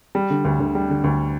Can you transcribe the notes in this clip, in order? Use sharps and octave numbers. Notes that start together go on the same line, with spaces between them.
G3
D3
D2
D2
G3
D3
D2